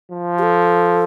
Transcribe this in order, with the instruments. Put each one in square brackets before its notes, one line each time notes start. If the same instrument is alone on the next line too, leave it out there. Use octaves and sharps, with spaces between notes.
[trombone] F3
[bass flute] G4
A4